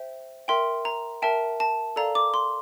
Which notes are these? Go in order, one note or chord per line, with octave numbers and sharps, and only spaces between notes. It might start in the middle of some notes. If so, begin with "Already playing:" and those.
Already playing: C5 E5 G5
A#4 E5 G5 C6
A#5
A#4 E5 G5 A5
A5
A4 D5 F5 A#5
D6
C6